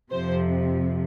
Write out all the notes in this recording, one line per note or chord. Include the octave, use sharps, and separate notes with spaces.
F2 C3 F3 C5